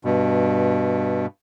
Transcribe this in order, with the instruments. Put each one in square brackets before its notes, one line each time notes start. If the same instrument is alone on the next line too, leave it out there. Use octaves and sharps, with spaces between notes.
[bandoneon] G2 B2